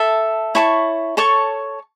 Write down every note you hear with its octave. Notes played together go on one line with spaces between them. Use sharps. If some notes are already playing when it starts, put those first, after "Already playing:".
Already playing: A4 E5 A5
E4 C#5 A5 C#6
A4 C#5 A5 C#6